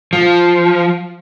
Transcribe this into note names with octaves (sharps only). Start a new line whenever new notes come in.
F3